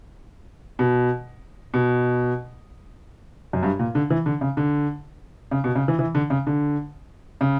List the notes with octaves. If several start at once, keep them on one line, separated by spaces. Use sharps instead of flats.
B2
B2
F#2
G2
A#2
D3
E3
D3
C#3
D3
C#3
B2
C#3
E3
E3
D3
C#3
D3
C#3